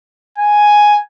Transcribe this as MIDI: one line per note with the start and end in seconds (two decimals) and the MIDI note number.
0.38 0.99 80